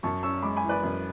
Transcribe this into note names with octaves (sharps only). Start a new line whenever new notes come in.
F#2 A5 C#6
C#4 C#6 E6
G#3 B5 D6
G#5 B5
E3
B4 D5
F#2